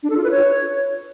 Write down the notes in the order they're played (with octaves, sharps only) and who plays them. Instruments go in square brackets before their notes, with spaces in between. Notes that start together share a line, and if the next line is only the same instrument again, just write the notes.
[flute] D4
A4
F4
B4
C#5